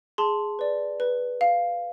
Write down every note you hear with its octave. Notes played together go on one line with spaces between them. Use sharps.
G#4 A5 C6
B4 D5
B4
F5